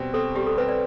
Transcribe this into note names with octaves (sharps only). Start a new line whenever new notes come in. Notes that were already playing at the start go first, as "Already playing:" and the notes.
Already playing: B2 G3 C4
C4 A4
G3 G4
A4
C4 B4
D5